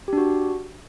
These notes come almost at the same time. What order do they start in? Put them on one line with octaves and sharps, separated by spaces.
G4 D4 F#4